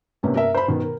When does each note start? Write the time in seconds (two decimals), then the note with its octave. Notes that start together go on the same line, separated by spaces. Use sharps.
0.23 G2 C3 A#3 B3 C#4
0.36 A#4 E5
0.54 C5 B5
0.68 B2 D#3
0.81 A#4